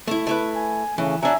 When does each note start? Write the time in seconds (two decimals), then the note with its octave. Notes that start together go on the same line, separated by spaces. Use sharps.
0.07 A3 E4
0.27 A3 E4 B4
0.55 G#5
0.98 C#3 E3 A3 C#4
1.23 F#3 D4 E5 G#5 A#5